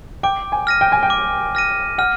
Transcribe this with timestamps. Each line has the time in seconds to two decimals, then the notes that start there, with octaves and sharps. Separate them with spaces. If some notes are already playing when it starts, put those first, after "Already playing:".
0.23 G5 D6
0.52 G#5
0.67 F6 A#6 D#7
0.81 G5
0.92 G#5
1.03 G5
1.10 D6
1.55 F6 A#6 D#7
1.98 F#5 F6